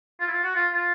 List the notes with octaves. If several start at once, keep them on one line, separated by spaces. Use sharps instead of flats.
F4
E4
F4
F#4
F4
F4